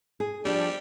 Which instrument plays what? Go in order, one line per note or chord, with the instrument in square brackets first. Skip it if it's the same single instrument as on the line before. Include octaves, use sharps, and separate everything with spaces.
[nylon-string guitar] G#4
[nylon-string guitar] F3 D4 G4 [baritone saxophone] G3